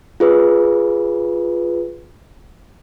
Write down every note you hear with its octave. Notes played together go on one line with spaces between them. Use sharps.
F4 G#4 B4